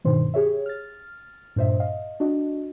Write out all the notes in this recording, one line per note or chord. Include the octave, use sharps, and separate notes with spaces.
G2 B2 D#3 C5 C6
G4 G#4 C#5 E5
F6 A6
G2 A#2 C5 D#5 E5
D#5 F5
D4 F#4 D#5